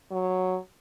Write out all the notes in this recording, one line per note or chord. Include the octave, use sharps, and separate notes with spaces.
F#3